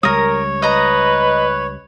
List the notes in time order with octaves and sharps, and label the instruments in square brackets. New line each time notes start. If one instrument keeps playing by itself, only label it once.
[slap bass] C#2 G3 [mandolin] A#4 D#6 [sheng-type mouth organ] C#5
[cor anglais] B4 [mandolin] D#5 A#5